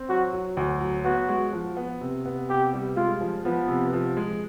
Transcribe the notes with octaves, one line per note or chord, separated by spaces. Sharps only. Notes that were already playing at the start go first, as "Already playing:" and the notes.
Already playing: C4
F#3 F#4
F#3
D2
F#3
B3 F#4
G#3
F3
B3
C3
B3
C3 G4
G3
G#3 F4
F3
F3 B3
C3
F3
G#3